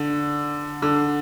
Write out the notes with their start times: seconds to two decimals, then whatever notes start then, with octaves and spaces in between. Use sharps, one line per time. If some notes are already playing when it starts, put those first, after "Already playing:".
Already playing: D3
0.82 D3